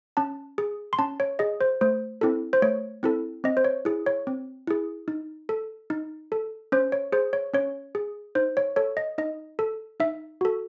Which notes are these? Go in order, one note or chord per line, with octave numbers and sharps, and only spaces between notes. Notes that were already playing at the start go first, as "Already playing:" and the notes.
C#4 A5
G#4
C6
C#4 A5
C#5
G#4 D#5
C5
A3 C5
C4 E4 A4
C5
A3 C#5
C4 E4 A4
C4 D#5
C5
C#5
E4 G#4
C#5
C4
E4 G#4
D#4
A4
D#4
A4
C#4 C5
C#5
G#4 C5
C#5
C#4 C#5
G#4
D#4 C5
C#5
A4 C#5
D#5
D#4 D#5
A4
D#4 E5
F#4 A4